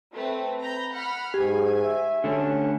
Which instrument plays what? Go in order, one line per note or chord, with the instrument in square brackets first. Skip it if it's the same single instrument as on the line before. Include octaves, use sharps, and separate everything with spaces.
[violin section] A3 C4 B4
A#5 B5 G6
F#5 B5 F6
[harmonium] G#2 [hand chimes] G4 [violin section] G#5
[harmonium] E5
[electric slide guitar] D3 A3 [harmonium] C#4